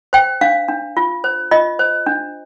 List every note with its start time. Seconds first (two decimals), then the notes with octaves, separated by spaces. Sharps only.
0.13 C5 G5
0.41 D4 F5
0.68 D4
0.97 F4
1.24 C5
1.51 F4 D#5
1.79 C5
2.06 D4